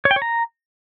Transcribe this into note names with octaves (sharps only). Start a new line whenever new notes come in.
C#5
G5
C#5
A#5